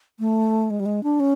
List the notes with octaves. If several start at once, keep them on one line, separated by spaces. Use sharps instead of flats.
A3
G#3
G3
G#3
D4
C#4